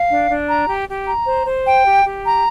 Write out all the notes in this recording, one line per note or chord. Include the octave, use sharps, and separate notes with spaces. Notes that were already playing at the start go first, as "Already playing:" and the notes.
Already playing: F5
D4
D4
A#5
G4
G4
A#5
C5
C5
G5
G4
G4
A#5